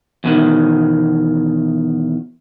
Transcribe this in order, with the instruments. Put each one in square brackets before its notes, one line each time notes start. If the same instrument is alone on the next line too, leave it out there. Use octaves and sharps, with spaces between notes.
[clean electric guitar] E2 B2 D#3